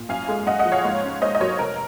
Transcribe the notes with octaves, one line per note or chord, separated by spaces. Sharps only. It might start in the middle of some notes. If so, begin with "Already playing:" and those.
Already playing: A#2
F#2 F5 G#5
G#3
F#2 D#5 F#5
D#5 F#5
F3
C#5 F5
G#2
C#4
G#2 C5 D#5
D#5
F#3 A#4 C#5
F1 A#4